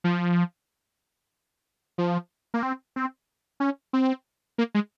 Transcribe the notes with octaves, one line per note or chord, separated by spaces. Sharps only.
F3
F3
A#3
C4
C4
C#4
C4
A#3
G#3